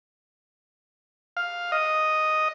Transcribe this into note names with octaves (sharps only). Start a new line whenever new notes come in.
F5
D#5